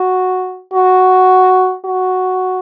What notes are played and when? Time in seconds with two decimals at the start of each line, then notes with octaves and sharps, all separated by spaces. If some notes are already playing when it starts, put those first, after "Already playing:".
Already playing: F#4
0.74 F#4
1.85 F#4